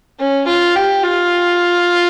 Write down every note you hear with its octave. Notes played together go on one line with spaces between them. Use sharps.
C#4
F4
G4
F4